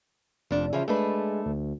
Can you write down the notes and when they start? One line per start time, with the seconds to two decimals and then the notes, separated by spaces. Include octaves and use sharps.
0.51 F1 F2 D4
0.73 C#3 E3 F3
0.88 G#3 A3 D4 B4
1.46 D2